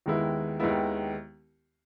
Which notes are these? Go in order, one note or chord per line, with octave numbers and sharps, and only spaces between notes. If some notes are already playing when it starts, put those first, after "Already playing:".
D#2 D#3 G#3 B3 E4
D#2 D#3 G#3 B3 E4